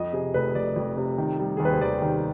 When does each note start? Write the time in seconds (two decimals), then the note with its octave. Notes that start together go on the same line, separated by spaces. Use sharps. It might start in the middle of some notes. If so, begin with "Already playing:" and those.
Already playing: F2 D#5
0.13 C3 G#4
0.34 F1 B4
0.55 F1 D5
0.76 F2
0.97 C3
1.18 D#3
1.39 G3
1.57 D#2 G#4
1.65 B4
1.73 C5
1.81 D#2 D5
2.02 D#3